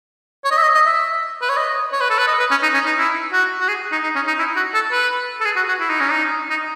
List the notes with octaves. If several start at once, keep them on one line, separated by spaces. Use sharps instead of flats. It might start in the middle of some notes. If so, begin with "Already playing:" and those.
C#5
D#5
E5
D#5
D#5
E5
B4
C#5
D#5
C#5
B4
A4
B4
D#5
B4
C#4
D#4
C#4
D#4
E4
F#4
F#4
G#4
D#4
D#4
C#4
D#4
E4
F#4
A4
B4
A4
G#4
F#4
F#4
E4
D#4
C#4
D#4
D#4